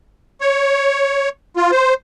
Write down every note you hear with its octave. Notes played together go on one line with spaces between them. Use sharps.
C#5
F4
C5